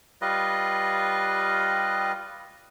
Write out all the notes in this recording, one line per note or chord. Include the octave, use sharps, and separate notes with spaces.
G3 F4 B4 D#5